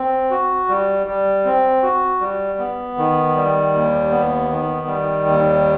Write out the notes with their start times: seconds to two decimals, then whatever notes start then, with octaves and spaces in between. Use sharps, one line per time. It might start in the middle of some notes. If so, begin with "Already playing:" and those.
Already playing: C4
0.31 F#4
0.69 G3
1.07 G3
1.45 C4
1.83 F#4
2.21 G3
2.59 B3
2.98 D#3
3.36 G3
3.73 D#2
4.11 B3
4.49 D#3
4.87 G3
5.26 D#2